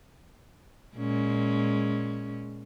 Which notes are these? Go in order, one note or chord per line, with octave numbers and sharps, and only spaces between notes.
A#2 G#3 C#4